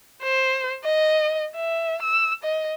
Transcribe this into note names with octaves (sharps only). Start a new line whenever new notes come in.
C5
D#5
E5
E6
D#5